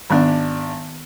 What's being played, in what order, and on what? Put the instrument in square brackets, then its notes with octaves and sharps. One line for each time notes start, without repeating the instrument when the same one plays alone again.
[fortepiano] G#1 D4 [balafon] D#3 B3